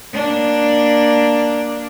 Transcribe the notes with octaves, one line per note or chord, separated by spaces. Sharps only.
A#3 D4